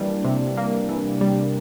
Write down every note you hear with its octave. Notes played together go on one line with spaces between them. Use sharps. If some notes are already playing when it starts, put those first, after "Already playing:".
Already playing: E3 G3 A#3 D4
C3
A#3
E3
G3